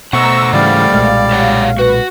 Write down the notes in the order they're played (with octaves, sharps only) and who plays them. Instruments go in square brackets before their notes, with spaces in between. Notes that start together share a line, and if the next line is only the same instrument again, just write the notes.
[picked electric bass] B2 [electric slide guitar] A3 C5 F#5 [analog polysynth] A#5 E6 A#6 [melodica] C#6
[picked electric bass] G#2 C#3 E3 [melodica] G3 D5 [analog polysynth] F5
[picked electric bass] B1 A#2 G#3
[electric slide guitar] G4 C#5 F#5
[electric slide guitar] F#4 F#5 [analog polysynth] B4